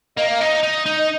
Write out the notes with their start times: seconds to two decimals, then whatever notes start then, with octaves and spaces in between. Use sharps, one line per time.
0.17 A#3 D#5
0.29 F5
0.41 D#4 D#5
0.63 D#4
0.86 D#4
0.98 D#5